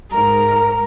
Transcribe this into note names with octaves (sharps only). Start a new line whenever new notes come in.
G#2 A#4 A#5